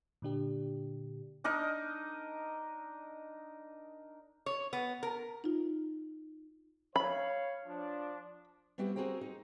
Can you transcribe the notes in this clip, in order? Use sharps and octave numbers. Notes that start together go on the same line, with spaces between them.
A#2 D3 D4 G4
D4 D#4 A#4 D#5
C#5
B3
A#4
D#4 F4
C#5 F5 B5
F3 D4
G3 B3 C4 E4 F#4 G4
C4 F#4 G#4 A#4 C5 G5
D#4